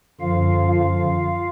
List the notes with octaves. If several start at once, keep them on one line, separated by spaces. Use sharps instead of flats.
F#2 D3 F3 F4 F5
F4 F5